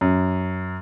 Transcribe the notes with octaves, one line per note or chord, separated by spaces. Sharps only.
F#2